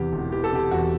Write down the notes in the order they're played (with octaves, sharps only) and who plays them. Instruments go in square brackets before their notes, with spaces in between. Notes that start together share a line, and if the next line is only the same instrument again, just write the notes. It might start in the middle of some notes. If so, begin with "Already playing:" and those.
Already playing: [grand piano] E2 C3 E3 G4
E1
E3 G4
A4
C3 G4
E2 F#4